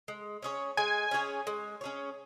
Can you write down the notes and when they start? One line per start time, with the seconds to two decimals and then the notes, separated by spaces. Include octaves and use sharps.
0.08 G#3
0.42 C#4 G#4 C#5
0.77 G#3 G#5
1.11 C#4 G#4 C#5
1.47 G#3
1.81 C#4 G#4 C#5